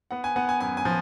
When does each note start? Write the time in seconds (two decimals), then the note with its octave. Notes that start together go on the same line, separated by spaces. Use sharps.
0.11 B3 F#5
0.24 G#5
0.36 B3 F#5
0.49 G#5
0.60 F#2 G#5
0.77 G#5
0.85 F3